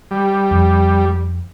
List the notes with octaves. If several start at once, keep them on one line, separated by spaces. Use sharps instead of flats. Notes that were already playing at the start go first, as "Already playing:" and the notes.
G3
F2